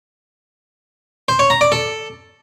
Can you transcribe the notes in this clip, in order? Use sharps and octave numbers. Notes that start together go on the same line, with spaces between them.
C5
C#5
A#5
D5
A4